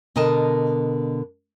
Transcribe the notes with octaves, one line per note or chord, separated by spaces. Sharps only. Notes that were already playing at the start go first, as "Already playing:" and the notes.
B2 D3 A#4 D#5 A5